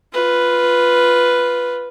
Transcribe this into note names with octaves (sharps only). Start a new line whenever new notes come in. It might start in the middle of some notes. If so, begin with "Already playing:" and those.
F4 B4